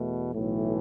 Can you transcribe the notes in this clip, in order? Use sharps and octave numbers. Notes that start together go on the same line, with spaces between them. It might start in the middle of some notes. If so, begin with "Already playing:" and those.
Already playing: E2 B2 A3
B1 A2 E3 A3